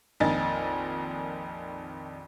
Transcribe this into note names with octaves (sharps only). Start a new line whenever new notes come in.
A#1 F2 D#3 D#5 G#5 A6